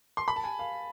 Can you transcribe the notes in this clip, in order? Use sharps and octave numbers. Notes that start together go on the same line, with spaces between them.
C6
B5
A5
G#5
F5